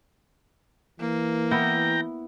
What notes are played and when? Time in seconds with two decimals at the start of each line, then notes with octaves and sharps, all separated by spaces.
1.00 E3 A#3
1.51 B3 E4 G5 A#5